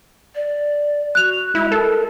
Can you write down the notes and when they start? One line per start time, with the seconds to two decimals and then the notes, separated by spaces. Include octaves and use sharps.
0.35 D5
1.15 F#4 F#6 F7
1.55 G#3 E4
1.72 A4 A#4